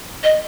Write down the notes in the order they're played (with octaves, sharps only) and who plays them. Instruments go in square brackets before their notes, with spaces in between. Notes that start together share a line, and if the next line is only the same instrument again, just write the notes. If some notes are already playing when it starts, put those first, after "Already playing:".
[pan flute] D#5